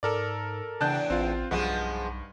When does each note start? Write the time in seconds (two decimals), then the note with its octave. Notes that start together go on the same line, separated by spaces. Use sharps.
0.03 G#2 A4 A#4 D5
0.81 E2 A2 C#3 D4 A5 F#6 G6
1.10 A1 C4 F4
1.51 B1 G2 F3 G#3 B3